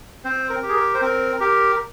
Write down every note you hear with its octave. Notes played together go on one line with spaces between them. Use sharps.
C4 C5
A#4
G4
G#4
A#4
C5
C4 A#4
G4 A#4